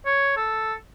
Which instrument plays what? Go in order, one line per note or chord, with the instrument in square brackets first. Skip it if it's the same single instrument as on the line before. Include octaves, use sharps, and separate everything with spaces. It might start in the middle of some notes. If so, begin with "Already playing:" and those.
[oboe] C#5
A4